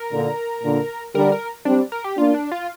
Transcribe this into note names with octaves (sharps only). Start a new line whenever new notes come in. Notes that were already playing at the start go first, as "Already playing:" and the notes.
Already playing: A#4
A#2 D3
A#2 D3
D3 G3 A#4
A#4
G3 C4 D4
A#4
G4
A#3 D4 F4
D4
F4